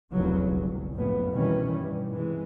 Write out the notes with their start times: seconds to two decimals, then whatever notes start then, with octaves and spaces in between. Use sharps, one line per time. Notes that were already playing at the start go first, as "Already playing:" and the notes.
0.11 F1 B1 E2 G2 C#3 F#3
0.47 G1 C2
0.94 F#1 F2 A2 C#3 F#3 B3
1.31 B2 D#3 E3 G3 C#4
1.74 G2
2.15 C3 E3 G#3